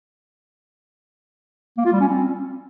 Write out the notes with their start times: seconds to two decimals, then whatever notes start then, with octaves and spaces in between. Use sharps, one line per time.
1.77 A#3
1.85 F4
1.93 G3
2.00 C#4
2.08 C4